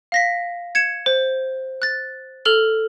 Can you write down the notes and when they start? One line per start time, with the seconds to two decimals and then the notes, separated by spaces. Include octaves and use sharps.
0.12 F5 A#6 B6
0.75 G#6 C#7 E7
1.06 C5
1.82 F#6 A6
2.45 A4 F6 F7 G7